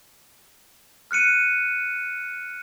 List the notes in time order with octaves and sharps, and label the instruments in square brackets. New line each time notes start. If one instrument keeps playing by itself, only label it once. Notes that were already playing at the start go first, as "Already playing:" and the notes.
[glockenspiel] F6 F#6 C#7 D#7